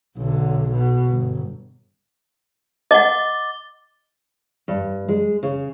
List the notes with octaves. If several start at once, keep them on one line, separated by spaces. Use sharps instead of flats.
B1 D3
B2
G1
D#5 F#5 D6 A6 G7
G2
G#3
C#3